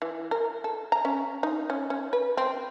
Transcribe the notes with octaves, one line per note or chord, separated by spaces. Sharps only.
E3
A#4
A4
A#5
C#4
D#4
C#4
C#4
B4
C4